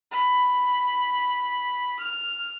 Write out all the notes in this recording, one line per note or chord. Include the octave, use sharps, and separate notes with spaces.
B5
F6